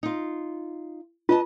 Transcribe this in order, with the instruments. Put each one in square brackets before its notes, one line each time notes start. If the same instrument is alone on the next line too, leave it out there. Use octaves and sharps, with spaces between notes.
[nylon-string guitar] D#4 F4
[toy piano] F4 [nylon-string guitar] B4 D#5 A5